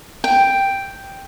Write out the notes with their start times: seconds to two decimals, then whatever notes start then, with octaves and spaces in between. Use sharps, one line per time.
0.24 G5